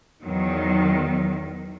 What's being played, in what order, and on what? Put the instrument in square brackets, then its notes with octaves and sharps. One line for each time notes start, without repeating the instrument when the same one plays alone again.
[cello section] E2 D#3 F#3